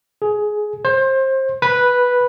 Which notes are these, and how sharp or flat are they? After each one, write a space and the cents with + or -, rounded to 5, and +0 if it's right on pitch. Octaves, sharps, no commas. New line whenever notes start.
G#4 +15
C5 +25
B4 -5